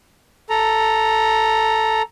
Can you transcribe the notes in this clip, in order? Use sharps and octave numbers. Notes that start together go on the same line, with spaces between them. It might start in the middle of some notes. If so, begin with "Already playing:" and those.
A4 A#5